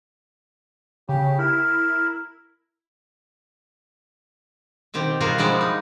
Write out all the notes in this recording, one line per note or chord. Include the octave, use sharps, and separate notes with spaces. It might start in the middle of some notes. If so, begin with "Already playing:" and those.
C#3 G4
E4 A#4
B2 D#3 C4 G4
B2 G3 F4 F#4 G#4 A#4
F3 G3 G#3 E4 F#4 D5
D#4